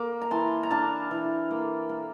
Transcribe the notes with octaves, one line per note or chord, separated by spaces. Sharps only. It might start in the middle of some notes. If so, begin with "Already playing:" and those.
Already playing: A#3 D6
A#5
E3 A5 C6
A#5
D4 F5 A5
E3
A#3
A#3